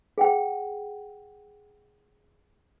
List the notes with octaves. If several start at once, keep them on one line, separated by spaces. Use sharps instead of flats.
G#4 F#5 G5